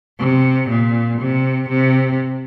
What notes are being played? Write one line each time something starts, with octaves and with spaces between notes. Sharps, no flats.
C3
A#2
C3
C3